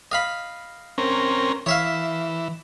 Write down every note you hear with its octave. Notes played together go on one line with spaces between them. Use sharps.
D#5 F5 B5
C4 C#4 A#4
E3 C#5 E5 F5